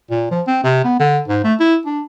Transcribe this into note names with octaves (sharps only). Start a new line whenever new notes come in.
A#2
F3
C4
C3
B3
D3
G#2
A3
E4
D4